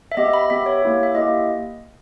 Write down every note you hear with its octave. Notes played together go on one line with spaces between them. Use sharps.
E5
B3 G4 D#5
E5
B5
B3 G4 E5
C#5
A#3 E4 G4
E5
A#3 E4 G4 D#5